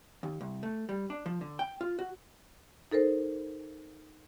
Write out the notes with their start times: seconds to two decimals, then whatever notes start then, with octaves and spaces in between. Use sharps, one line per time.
0.23 D#2
0.41 C2
0.63 A3
0.89 G3
1.10 D4
1.26 F3
1.41 D3
1.59 G5
1.81 F4
1.99 F#4
2.91 D#4 A4 A#4 C5